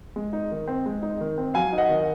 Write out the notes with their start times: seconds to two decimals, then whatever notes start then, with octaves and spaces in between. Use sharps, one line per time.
0.16 G#3
0.33 D#4
0.51 D#3
0.67 C4
0.86 G#3
1.02 D#4
1.21 D#3
1.38 C4
1.54 F#3 F5 G#5
1.73 D#4
1.78 D#5 F#5
1.89 D#3